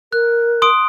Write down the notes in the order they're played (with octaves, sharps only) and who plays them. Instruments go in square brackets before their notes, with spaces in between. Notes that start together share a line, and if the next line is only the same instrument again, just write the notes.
[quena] A#4 [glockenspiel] F#6
[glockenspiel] C6 D#6 D7